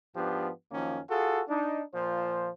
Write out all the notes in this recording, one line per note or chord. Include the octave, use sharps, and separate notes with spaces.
G#2 F3 B3 D4 G4
F#2 D#3 F3 A#3 C#4
F4 F#4 G#4 A4
D4 D#4
A#2 F3 C5